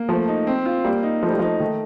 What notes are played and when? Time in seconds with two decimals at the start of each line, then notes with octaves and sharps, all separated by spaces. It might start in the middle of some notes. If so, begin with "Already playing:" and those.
Already playing: A#3
0.09 F3 A3
0.28 D#4
0.47 C4
0.65 F4
0.84 G3 A#3
1.03 D#4
1.22 F3 A3
1.30 G3
1.39 F3 D#4
1.60 D#3 A3